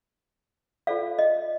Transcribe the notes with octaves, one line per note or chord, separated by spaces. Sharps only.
F4 A4 C5 D5 F5
D#5